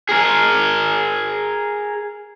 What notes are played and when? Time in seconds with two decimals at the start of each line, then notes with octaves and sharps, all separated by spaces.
0.09 G#4 A#4